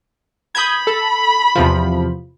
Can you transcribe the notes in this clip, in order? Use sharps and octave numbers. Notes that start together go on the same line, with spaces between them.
B5 D#6 G6 G#6
A4
E2 C3 F3